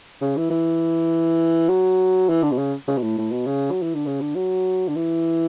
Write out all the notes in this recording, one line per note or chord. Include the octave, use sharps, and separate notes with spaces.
C#3
E3
E3
F#3
E3
D3
B2
C#3
C#3
B2
A2
A2
B2
C#3
F#3
E3
D3
C#3
D3
F#3
D3
E3